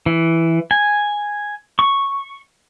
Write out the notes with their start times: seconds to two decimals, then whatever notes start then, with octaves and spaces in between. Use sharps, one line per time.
0.06 E3
0.71 G#5
1.79 C#6